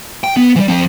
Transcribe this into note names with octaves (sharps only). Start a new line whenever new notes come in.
G5
B3
E3 G3
F3 C4